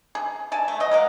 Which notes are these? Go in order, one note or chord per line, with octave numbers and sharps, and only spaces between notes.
G#4
D5 G#5 A5
A3
F#3 D#5
G#3 A#4 F5 F#5